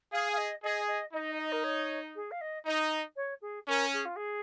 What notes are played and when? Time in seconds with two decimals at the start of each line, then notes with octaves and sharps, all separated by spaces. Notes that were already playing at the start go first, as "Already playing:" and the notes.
0.12 G#4 F5
0.33 F5
0.38 D#5
0.63 G#4 D#5
0.88 D#5
1.13 D#4 D#5
1.39 D#5
1.52 A#4
1.64 C#5
2.16 G#4
2.31 F5
2.41 D#5
2.66 D#4 D#5
3.16 C#5
3.42 G#4
3.68 C#4 A#4
3.93 G#4
4.05 F4
4.16 G#4